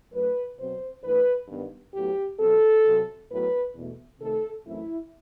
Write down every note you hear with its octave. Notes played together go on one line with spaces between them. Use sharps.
F#2 F#3 A3 B4
B2 F#3 C4 C5
G2 E3 A3 B4
G2 D#3 G3 B3
A2 F#3 B3 G4
B2 F#3 C4 A4
C3 F#3 C4
A2 F#3 B3 B4
E2 B2 A3
C3 D#3 A3 A4
F#2 E3 A3 C4 E4